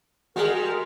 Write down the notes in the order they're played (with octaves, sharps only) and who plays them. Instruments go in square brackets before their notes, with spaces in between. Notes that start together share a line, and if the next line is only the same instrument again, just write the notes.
[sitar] G3 G#3 [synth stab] F#4 G#4 [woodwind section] A#4